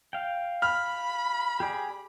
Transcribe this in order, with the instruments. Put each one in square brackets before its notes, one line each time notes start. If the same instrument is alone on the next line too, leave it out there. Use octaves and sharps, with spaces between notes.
[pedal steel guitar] F5 G5
[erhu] B5 [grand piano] F6
[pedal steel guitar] G4 G#4 D5